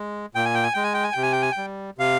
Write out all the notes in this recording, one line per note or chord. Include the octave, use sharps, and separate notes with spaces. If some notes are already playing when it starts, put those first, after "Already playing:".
Already playing: G#3
A#2 G5
G#5
G5
G#5
G#3 G5
G#5
G5
G#5
C3 G5
G#5
G5
G#5
G5
G3
C3 F5